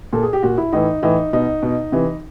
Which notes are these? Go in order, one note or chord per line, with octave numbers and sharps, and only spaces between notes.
A#2 A4
G#4
G4
A#2 F#4
E4
A2 E3 D#4
A2 E3 D#4
B2 D#4
B2
C3 E3